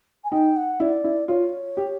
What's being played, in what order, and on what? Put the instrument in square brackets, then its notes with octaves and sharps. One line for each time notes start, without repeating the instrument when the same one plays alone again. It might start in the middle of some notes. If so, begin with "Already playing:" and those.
[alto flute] G#5
[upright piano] D#4 [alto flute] G5
[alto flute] F#5
[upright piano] E4 [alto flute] D5
[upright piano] E4
[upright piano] F4 [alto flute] C#5
[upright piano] G4